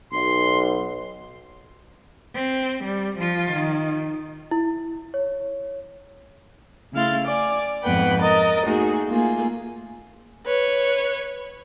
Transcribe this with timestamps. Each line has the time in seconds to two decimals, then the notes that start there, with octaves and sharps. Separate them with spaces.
0.12 B1 C6
2.36 C4
2.85 G3
3.19 F3 F4
3.53 D#3
4.51 E4
5.14 C#5
6.93 C#3 A3 E4 F5 C6 A6
7.25 D5 G#5 D6
7.83 F2 G#2 B3 B4 F#5 G5
8.21 A#4 D#5 A#5 A6
8.63 A3 A#3 D#4 F#4 G#4
9.08 A3 A#3 F4 G#4
10.46 B4 C#5